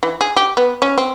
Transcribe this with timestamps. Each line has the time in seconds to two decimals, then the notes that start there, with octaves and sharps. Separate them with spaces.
0.03 E3
0.21 G#4
0.36 G4
0.57 B3
0.82 C#4
0.98 C4